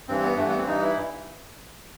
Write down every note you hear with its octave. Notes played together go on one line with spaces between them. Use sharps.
G2 E3 C4
B3
G2 E3 A3
B3
C4
G2 E3 D#4
E4